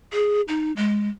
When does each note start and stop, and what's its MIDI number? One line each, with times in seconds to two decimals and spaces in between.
0.13 0.41 68
0.48 0.72 63
0.77 1.08 56